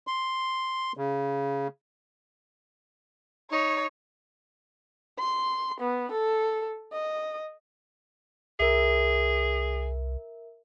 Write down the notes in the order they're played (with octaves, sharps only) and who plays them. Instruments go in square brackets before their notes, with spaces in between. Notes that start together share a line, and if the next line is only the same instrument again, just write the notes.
[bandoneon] C6
C#3
[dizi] D#4 [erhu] C#5
[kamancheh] C6
B3
A4
D#5
[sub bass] C2 [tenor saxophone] G#4 [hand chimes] A#4 E5